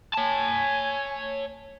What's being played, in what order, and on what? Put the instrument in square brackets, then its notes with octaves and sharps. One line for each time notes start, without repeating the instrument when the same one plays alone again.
[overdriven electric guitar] C#5 A5 [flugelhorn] G#5